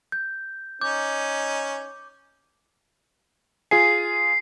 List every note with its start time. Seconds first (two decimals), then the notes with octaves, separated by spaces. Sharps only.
0.12 G6
0.81 C#4 D#4 D6 G6
3.71 F4 G#4 G#5 C7